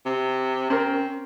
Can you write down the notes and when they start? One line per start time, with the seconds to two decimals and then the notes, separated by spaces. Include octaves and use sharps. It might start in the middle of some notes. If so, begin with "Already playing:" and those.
0.06 C3
0.70 C4 C#4 A#4